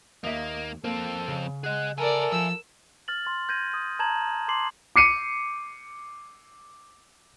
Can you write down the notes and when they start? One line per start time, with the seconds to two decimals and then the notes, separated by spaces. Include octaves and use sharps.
0.24 D#2 A#3 D#5 E5
0.84 F2 A#3 C4 A4
1.28 C#3
1.64 G#4 D#5 F#5
1.98 A4 A#4 D5 E5 G#5
2.32 F3 E6
3.08 F6 A6 F#7
3.25 C6 A6
3.49 G6 G#6 A#6 D#7
3.74 D#6
3.99 A5 A#5 G#6 E7 F#7
4.48 A5 C6 D6 C7 F#7
4.96 D6 C7 C#7 D#7